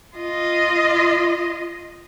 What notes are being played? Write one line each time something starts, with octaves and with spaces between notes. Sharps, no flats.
F4 D#5